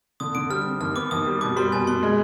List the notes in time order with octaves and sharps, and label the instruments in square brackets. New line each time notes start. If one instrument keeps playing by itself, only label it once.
[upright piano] D3 [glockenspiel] D#6
[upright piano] D3 [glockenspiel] D7
[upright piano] G3 [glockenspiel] F6
[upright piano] C4
[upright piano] D#2 [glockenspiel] F6
[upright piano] B3 [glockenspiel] D6
[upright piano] D#2 [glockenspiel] D#6
[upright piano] G3
[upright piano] B2 [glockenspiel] D6
[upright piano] G3 [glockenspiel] C6
[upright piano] B2 [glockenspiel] G#5
[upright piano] B2 [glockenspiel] C6
[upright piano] G#3